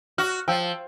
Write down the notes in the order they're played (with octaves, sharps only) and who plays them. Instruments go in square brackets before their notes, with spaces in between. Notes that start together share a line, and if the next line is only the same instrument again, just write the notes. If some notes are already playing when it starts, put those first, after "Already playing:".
[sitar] F#4 [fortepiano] F6
[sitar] F3 [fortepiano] G5 E6